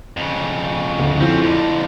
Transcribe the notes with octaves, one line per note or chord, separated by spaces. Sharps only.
F2 C#3
D2
F2 C4 C#4 E4 F4
F2 D3 E4